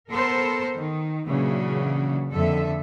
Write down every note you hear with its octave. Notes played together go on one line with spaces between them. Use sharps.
B3 A4 A#4 C5
D#3
A#2 C#3 E3 F#3 D4 F#4
F2 D3 A#3 A4 E5